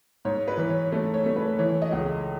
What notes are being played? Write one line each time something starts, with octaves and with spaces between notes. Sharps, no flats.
G#2 C#5
B4
E3
C#5
A3 C#5
C#5
A3
B4
E3 C#5
D#5
C#2